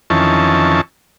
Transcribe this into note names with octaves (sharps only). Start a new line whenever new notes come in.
F2 D#3 E3 C#4 A5